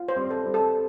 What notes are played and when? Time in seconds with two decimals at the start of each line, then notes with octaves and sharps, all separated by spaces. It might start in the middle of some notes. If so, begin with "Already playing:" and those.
Already playing: F4
0.09 C5
0.16 G3 C4
0.31 A4
0.46 G3 C4
0.54 A4